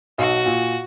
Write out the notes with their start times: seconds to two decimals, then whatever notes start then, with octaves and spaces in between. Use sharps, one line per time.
0.18 B1 F#4
0.46 A#2